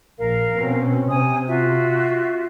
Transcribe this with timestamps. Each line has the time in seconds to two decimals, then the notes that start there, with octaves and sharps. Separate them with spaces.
0.18 A#1 A#4 F5
0.54 B2 C4 C#4
1.09 C3 G#5 D#6
1.47 F4 F#4 E5